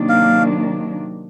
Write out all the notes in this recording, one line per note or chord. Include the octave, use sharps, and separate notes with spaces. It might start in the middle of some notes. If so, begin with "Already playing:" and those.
Already playing: C3 D#3 F#3 A#3 D4
F5